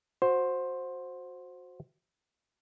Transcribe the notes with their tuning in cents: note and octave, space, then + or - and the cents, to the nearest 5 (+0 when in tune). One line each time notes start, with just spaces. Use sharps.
F#4 -20 C5 +5